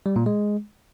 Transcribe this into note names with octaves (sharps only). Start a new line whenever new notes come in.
G3
A#2
G#3